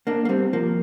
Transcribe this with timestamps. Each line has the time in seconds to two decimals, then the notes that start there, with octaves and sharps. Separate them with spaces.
0.07 A#3 D4
0.25 A#3
0.29 G3 C4
0.53 F3 A#3